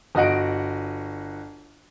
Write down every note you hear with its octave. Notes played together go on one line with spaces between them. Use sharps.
G1 F#4 D#5 F#5 D7